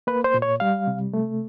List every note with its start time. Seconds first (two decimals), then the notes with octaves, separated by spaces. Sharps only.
0.07 A#3 B4
0.24 C5
0.34 A#2
0.42 C#5
0.60 G3 F5
0.87 C3
1.14 A3